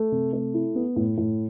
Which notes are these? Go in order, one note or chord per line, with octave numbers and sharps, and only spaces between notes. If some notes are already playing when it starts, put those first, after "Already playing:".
Already playing: A3
C3
A3
E4
B3
A2
A2